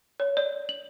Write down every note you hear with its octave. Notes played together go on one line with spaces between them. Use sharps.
C#5
D5
F#7